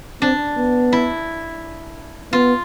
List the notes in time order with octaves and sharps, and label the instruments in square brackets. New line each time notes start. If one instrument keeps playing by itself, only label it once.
[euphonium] C4 [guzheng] D4
[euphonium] B3
[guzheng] E4
[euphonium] B3 [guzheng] F4